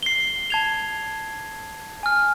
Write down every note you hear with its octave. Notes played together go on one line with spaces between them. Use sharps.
C7 G7
A5 G#6 F7
G#5 F6